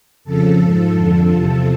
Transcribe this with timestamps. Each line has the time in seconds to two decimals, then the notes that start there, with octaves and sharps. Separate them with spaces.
0.24 F2 C#3 F3 A4
0.59 G#2 F3
0.94 F2 D3 F3 A4
1.29 E2 C3 F3